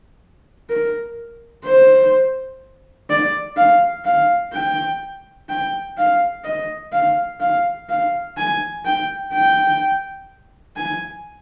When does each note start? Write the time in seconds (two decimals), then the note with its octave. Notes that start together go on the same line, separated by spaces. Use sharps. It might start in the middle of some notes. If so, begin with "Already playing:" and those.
0.70 A#4
1.65 C5
3.10 D5
3.57 F5
4.05 F5
4.53 G5
5.49 G5
5.97 F5
6.44 D#5
6.93 F5
7.41 F5
7.89 F5
8.37 G#5
8.85 G5
9.33 G5
10.76 G#5